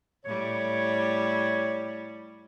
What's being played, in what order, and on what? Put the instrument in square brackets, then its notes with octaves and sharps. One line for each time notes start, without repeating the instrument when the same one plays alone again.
[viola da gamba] A2 G3 [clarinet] C#5